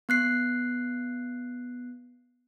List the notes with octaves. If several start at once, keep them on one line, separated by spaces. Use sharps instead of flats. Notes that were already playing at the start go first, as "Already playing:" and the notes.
B3 F#6 C7